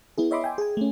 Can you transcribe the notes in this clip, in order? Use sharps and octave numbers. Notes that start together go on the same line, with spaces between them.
B3 E4 G#4
C#5 D#5 E5 B5 C6 D6
D#5 G5 G#5
G#4 G#5
A3 C#4